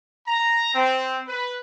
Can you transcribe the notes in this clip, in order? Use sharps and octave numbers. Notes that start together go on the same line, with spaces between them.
A#5
C4
B4